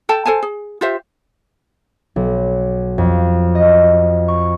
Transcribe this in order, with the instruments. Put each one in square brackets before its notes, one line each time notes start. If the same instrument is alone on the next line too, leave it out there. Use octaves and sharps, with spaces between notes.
[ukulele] A4 G5 A5
A4 C5 G#5 A5
G#4
F4 G4 C5 E5
[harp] B1
F2
D#5
C#6